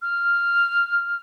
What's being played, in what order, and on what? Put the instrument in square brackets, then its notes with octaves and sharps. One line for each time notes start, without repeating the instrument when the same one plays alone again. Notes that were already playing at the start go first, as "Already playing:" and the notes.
[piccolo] F6